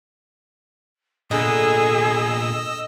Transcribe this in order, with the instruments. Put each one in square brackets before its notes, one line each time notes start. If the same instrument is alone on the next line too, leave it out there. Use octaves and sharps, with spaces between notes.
[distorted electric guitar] A#2 B3 [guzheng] D3 [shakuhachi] G#4 [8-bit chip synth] D#5 E6